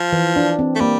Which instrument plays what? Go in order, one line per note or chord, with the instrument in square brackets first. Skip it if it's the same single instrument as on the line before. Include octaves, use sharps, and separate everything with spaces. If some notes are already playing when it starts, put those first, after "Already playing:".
Already playing: [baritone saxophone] F3
[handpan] E3
D4
C4
[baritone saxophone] A3
[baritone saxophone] G3 [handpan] A#3